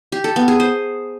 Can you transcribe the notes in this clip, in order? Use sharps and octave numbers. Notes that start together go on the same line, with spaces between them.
G4
A4
B3
G#4
C5